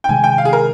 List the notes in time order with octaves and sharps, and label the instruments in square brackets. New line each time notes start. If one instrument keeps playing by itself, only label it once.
[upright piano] G5
[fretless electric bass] C3 D#3 G#3 [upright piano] G#5
[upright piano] G5
F5
G#4
A#4